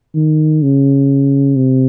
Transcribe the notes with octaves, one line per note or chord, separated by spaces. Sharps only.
D#3
C#3
C3